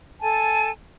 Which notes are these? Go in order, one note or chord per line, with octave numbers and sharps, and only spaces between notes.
A4 G#5 A5